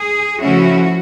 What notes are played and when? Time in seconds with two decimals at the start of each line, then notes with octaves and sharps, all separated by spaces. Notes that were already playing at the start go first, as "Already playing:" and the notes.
Already playing: G#4
0.40 C#3 F3 A3 C#4 E4 F#4